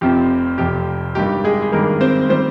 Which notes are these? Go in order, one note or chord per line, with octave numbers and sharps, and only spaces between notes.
F1 F2 C3 F3 C4 G4
F1 F2 C3 F3 C4 G4
G#1 G2 D#3 G3 G4
G#3 G#4
G#4
G#1 G2 D#3 G3 A#3 A#4
C4 C5
D#3 G3 C4 C5